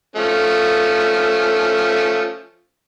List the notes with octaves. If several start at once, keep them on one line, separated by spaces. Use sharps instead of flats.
F3 A3 C#4